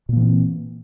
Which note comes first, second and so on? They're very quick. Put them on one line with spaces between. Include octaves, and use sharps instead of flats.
A#2 A#3 E3 C4